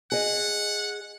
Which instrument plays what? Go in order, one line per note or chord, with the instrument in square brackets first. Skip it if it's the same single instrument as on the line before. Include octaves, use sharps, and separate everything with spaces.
[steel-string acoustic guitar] G#4 D#5 [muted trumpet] F#5